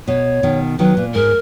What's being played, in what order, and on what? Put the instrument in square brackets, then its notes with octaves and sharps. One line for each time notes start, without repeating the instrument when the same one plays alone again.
[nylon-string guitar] B2 [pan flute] C#5
[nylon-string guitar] B2 D#3
[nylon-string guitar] D#3 F#3 [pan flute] B4
[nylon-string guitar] A#2
[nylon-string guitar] G#2 [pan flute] A#4